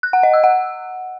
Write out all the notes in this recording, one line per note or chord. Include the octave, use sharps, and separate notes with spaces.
F#6
F#5
D#5
E6
F#5